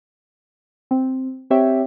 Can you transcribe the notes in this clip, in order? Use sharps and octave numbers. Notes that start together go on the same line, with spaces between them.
C4
C4 G4 C#5 E5 G5